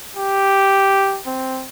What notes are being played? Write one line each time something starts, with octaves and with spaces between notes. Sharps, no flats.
G4
C4